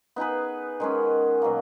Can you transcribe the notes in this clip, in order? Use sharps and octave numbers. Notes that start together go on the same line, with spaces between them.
B3 D#4 G#4 B4
D#3 G#3 C#4
B2 F#3 A#3